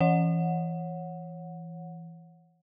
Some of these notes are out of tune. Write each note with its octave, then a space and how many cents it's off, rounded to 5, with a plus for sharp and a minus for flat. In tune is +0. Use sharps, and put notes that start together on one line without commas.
E3 +20 C#5 -10 F#5 -15